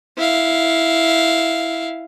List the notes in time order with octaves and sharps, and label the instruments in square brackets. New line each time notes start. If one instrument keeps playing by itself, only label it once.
[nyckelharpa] E4 F5